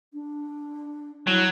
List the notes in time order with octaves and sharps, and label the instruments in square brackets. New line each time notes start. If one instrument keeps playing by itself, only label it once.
[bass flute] D4
[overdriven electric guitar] F#3 [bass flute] E4